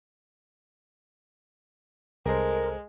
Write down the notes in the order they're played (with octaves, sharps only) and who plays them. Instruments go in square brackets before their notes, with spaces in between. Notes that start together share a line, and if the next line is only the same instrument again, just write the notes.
[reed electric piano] C2 A4 C5 [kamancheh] G#3 [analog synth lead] A#4